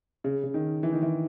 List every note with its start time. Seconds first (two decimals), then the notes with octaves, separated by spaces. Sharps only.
0.24 C#3
0.43 C#3
0.54 D#3
0.83 E3
0.93 D#3
1.02 E3